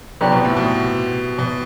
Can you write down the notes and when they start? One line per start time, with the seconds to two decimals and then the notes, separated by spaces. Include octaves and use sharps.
0.21 C3 F#3 B3 E4 G4 D5
0.32 B2
0.45 A2
0.56 B2
1.39 B2